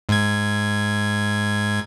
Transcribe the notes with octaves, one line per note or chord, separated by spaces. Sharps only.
G#2 G#6